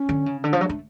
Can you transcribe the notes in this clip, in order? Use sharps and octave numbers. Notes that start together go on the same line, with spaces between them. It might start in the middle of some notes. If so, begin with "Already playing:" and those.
Already playing: C#4
D3
C#3
D3 D4
F3
F#3
A3